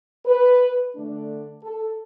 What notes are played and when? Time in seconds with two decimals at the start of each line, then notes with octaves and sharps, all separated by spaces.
0.25 B4
0.94 D3 A3 D4
1.63 A4